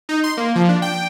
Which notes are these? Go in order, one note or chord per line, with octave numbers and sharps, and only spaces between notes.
D#4
C6
A#3
F3
D4
G5